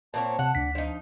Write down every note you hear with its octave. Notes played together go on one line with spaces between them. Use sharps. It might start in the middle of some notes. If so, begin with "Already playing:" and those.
A#2 C4 C#5 A5
C3 F#5
D2 D4 B6
F3 D4 D#4